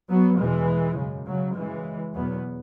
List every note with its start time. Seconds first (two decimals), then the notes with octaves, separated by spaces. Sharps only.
0.09 F#3 B3
0.38 E2 B2 E3 G#3
0.96 F#2 C#3
1.27 C#3 F#3
1.55 F#2 C#3 E3 G#3
2.14 E2 B2 F#3 B3